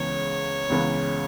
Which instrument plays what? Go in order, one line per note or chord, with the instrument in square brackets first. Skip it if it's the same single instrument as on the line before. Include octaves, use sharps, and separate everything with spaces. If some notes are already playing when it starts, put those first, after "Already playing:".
Already playing: [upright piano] C#2 C#3 E3 B3 [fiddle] C#5
[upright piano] C#2 C#3 E3 B3